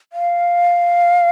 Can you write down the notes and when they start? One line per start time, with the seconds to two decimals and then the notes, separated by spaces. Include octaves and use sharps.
0.13 F5